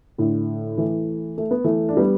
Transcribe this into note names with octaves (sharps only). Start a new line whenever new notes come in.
A2 D3
E3 A3
A3
B3
E3 A3
D4
G3 B3